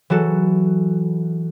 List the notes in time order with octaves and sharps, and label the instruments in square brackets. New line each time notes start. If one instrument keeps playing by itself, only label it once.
[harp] E3 F#3 F#4 A4